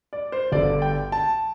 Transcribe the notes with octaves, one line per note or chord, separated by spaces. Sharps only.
D5
C5
G1 G2 D3 D5
G5
A5